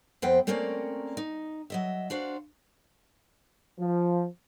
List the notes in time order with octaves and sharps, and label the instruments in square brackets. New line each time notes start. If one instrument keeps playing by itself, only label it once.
[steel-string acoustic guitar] F2 F3 B3 C4 C5 G5
A3 A#3 C4 C#4 A#4 D5
D#4
F#3 D#5 E5
D4 F#4 C5 F5
[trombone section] F3